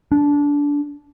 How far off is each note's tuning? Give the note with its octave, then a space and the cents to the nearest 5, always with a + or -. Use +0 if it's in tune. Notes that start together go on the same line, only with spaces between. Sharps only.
D4 -20